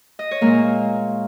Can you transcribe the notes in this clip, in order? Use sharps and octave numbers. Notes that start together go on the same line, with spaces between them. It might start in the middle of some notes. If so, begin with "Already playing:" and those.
D#5
C#5
A#2 G#3 A#3 A#4